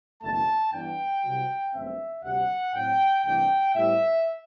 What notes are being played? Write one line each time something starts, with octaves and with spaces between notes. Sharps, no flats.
F#1 E2 B2 A3 D4 A5
G2 E3 B3 D4 G5
C2 C3 F#3
G1 F#2 D3 A3 C4 E5
D2 C3 G3 F#5
A2 F#3 C4 G5
C2 C3 E3 A3 D4 G5
A2 G3 B3 E5